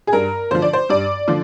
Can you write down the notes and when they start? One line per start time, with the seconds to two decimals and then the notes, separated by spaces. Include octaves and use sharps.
0.07 G#4
0.13 G2 A#4
0.51 D3 F3 C5
0.62 D5
0.73 C5
0.89 G2 D5
1.28 D3 F3